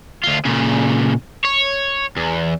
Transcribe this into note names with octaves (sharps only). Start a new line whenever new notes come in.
D2 F4
A#2 C#3
C#5
E2